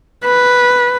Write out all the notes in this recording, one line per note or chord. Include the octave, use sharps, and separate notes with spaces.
B4